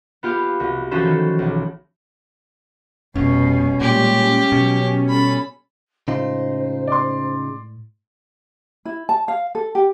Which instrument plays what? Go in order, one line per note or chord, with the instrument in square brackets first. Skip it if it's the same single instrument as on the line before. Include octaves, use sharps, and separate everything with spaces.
[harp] B3 F4 G4 F5
C2 F#4
E3 F3 C#4 F#4 A4 C5
D#3 E3 A3
B1 G3
[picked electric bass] F1 [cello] B2 G3 [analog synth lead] C#4
[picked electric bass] A#2 [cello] G3 G#3 [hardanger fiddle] G4
[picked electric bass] B2 [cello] F#3
[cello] G3 A4 [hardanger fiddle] B5
[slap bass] A2 G#3 [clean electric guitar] C#3 D#4 F4 [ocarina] C5
[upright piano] D5 C6
[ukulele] E4
A5
F5
A4
G4